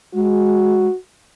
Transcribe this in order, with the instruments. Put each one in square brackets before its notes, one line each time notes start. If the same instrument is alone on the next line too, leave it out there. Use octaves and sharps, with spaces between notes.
[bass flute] G#3 [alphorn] F#4